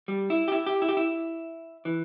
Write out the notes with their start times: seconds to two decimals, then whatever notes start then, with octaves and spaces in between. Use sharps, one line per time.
0.08 G3
0.30 E4
0.48 G4
0.52 E4
0.66 G4
0.82 E4
0.88 G4
0.97 E4
1.85 E3